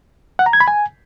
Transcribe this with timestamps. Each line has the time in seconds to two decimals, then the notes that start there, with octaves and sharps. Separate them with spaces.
0.39 F#5
0.46 A#5
0.53 G#6
0.60 B5
0.68 G#5